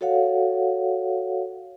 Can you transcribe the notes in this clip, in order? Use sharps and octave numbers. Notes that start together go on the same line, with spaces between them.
F#4 A4 C#5 F5 F#5